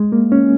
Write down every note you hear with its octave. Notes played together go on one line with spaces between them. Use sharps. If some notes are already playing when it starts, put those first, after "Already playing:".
Already playing: G#3
A#3
C#4